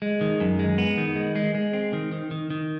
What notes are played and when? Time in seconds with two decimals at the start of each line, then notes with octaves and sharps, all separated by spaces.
0.02 G#3
0.21 D#3
0.40 F#2
0.59 G#3
0.78 B3
0.98 D#3
1.16 G#3
1.36 G#3
1.55 G#3
1.73 C4
1.93 D#3
2.12 D#3
2.31 D#3
2.50 D#3